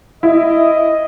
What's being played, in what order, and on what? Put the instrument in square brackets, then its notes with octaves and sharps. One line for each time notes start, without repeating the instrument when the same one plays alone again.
[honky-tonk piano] E4 [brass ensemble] D#5